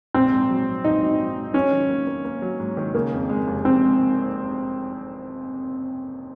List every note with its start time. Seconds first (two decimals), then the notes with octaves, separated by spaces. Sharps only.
0.14 A#1 C4
0.32 G#2
0.50 F#3
0.67 G#2
0.84 A#1 D#4
1.02 F#3
1.19 F#3
1.37 G#2
1.54 F#3 C#4
1.72 D#3
1.90 A#3
2.07 A#3
2.25 A#3
2.42 F#3
2.60 G#2
2.77 D#3
2.94 C#3 A#3
3.12 F2
3.29 G#3
3.47 F1
3.65 F1 C4
3.82 G#3